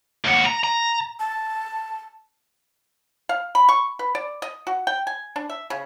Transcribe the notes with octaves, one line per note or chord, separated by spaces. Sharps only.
D#2 F#4
A#5
A#5
A5
F5
B5
C#6
B4
D5
D#5
F#4
G5
G#5
D4
E5
C#3